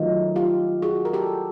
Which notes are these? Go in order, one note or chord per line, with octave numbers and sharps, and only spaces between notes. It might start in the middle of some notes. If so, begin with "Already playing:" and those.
Already playing: D#3 F#3 A3 D#4 F4
F4 G4
F#4 G#4
A#4
G4 A4